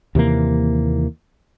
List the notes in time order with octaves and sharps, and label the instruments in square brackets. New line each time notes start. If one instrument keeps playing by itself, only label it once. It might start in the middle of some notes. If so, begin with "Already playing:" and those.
[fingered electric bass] D#2 C3 E3 A#3